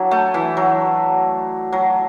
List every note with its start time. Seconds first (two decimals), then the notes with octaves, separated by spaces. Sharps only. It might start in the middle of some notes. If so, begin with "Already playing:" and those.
Already playing: F#3 D4 E4
0.11 A3
0.34 E3
0.57 F#3
1.72 F#3